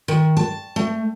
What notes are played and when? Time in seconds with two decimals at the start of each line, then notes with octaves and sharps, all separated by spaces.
0.08 D#3
0.37 A5
0.76 A3